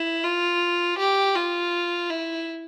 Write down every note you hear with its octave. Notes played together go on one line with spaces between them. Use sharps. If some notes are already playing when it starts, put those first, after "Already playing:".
Already playing: E4
F4
G4
F4
E4